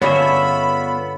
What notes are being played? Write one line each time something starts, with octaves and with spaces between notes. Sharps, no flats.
G2 D3 B3 F4 G#4 C#5 E5 B5